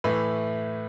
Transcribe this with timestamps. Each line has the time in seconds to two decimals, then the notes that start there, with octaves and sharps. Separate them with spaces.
0.04 A2 E3 A3 B4